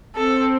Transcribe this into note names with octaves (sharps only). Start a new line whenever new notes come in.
C4 A4